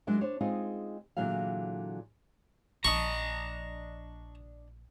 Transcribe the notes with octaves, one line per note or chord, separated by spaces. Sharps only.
F#3 G#3 D4 E4 A#4
D4 C5 C#5
G#3 C4 D#4 F4 G#4
A#2 D3 E3 F#3 G#4 F5
A#1 F3 D4 D5 D#5 A5 A#5 C#6